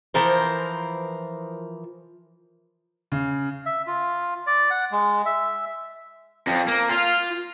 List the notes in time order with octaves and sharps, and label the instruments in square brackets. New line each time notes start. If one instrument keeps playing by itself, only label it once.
[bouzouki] E3 F3 A#4 C5
[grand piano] C#3
[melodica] E5
F4
D5
F#5
G#3
E5
[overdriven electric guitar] F2
A#3
F4